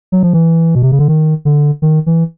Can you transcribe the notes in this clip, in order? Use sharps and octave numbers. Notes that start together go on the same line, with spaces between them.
F#3
F3
E3
B2
C3
C#3
D3
D#3
D3
D#3
E3